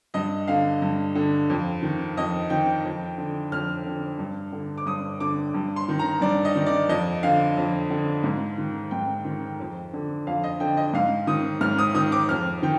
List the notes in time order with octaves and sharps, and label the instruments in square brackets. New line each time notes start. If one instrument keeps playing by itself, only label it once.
[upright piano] G2 D#5
D3 F5
G2
D3
F2
D#3
F2 D#5
D#3 G5
F2
D3
F2 F6
D3
G2
D3
D6
G2 D#6
D3 D6
G2
C6
D#3
A#5
G2 D5
D#5
D#3
D5
F2 D#5
D3 F5
F2
D3
G#2
D#3
G#2 G5
D#3
F2
D3
F2 F5
D#5
D3 G5
D#5
G#2 F5
D#3 D#6
G#2 F6
D#6
D#3 D#6
D6
F2 F6
D#3 G5